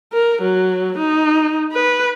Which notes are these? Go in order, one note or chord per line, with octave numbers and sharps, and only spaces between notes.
A#4
F#3
D#4
B4